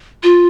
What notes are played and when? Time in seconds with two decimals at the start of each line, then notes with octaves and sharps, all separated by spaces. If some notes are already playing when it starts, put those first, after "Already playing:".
0.23 F4